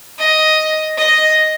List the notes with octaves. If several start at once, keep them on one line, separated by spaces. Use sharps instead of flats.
D#5
D#5